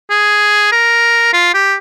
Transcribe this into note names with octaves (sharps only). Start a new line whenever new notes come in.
G#4
A#4
F4
G4